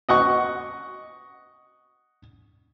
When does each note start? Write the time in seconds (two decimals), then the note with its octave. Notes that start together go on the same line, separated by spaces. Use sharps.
0.09 D#5 F#5 C#6